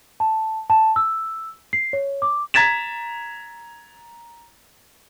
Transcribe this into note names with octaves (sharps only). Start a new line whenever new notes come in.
A5
A5
E6
C7
C#5
D6
A#5 G#6 A6 B6 E7